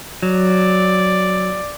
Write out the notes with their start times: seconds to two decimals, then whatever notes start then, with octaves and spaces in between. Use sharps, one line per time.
0.23 F#3 D5